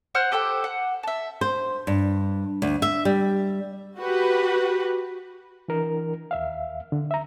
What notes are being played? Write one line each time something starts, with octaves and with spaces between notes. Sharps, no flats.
C5 F#5 F6 F#6
G4 A4 C5 G5
F#5
E5 A5
C5
G2
D2
E5
G3
F#4 G4 B4
E3 D4 A#4
D#2 E5 F5
D3
E5 A#5